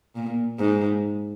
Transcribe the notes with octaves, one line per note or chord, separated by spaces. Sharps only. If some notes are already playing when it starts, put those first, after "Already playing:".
A#2
G#2